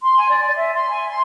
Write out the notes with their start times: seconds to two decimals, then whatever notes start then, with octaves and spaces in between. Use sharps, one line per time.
0.02 C6
0.17 G#5
0.30 D5
0.55 E5
0.74 C6
0.88 G#5
1.09 C6